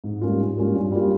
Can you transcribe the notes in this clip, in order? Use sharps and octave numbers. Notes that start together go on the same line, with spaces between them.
G#2
G3 A#3 C#4 F4
G#2
G3 A#3 C#4 F4
G2
G3 A#3 F4